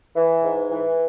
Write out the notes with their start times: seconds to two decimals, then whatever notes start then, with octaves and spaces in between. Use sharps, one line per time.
0.16 E3
0.43 G#2
0.71 E3